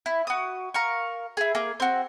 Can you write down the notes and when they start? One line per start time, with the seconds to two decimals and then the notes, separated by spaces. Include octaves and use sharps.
0.06 E4
0.27 F#4 D#6
0.74 A#4 F5 C#6
1.37 E4 G#4
1.55 A#3 G#4
1.80 C4 F#4